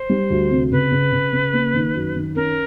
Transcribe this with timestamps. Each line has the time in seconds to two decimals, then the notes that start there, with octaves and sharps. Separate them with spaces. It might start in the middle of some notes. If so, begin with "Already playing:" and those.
Already playing: C5
0.09 G3
0.30 D2
0.51 C3
0.72 C#3 B4
0.92 C#3
1.12 C#3
1.33 C#3
1.53 A#3
1.74 D#3
1.95 F#2
2.16 D#3
2.36 C#4 A#4